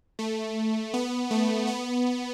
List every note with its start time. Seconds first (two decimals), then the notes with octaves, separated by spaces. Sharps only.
0.19 A3
0.94 B3
1.31 A3
1.67 B3